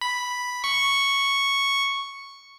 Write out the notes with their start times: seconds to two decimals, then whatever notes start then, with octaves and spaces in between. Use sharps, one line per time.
0.01 B5
0.64 C#6